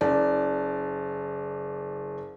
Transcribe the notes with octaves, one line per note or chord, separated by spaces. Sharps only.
F#1 D5